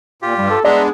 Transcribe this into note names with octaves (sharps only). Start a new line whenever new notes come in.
A#2 F4 G4
G2 G3
A4
G#3 B3 D4 G#4 D5 E5 A#5 C6